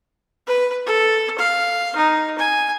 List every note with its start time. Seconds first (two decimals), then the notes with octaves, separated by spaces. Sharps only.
0.47 B4
0.86 A4
1.38 F5
1.96 D#4
2.38 G#5